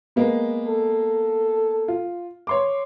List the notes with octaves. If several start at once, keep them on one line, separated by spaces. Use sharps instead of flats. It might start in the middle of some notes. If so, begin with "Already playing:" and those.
G#3 A#3 B3
A4
F4
C#5 C6 D6